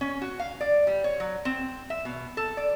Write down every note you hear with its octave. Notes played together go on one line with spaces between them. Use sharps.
C#4
F#4
F5
D5
G3
C#5
F#3
C4
E5
B2
A4
D5